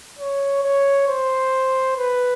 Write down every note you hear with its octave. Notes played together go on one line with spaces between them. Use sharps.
C#5
C#5
C5
B4